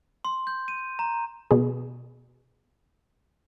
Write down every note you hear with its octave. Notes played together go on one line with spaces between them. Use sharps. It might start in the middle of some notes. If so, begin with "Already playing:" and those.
C6
G6
D#7
A#5
B2 G#4